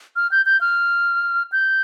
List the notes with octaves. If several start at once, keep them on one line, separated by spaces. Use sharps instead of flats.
F6
G6
G6
F6
G6